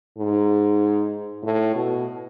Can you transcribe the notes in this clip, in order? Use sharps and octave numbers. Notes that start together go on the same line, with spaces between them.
G#2
A2
B2